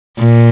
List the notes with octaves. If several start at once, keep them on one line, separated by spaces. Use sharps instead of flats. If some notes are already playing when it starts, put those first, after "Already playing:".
A#2